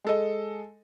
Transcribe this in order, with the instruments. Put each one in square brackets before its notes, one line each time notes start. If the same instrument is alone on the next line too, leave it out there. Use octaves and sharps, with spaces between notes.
[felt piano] G#3 A4 D#5